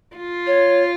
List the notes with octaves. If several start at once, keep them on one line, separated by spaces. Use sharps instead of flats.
F4
C#5